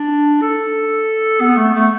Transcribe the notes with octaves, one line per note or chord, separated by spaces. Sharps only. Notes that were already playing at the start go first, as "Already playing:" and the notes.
Already playing: D4
A4
B3
A3
A3